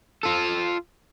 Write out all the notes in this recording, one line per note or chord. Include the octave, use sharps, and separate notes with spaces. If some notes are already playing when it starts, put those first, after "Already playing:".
F4 A4